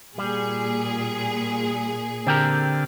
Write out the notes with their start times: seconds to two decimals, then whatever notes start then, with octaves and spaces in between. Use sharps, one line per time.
0.18 A#2 G3 G#4
2.27 D3 C4 G4 A#4